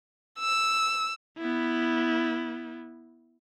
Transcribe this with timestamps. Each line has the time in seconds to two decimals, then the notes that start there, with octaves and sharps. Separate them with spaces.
0.39 E6
1.38 B3 E4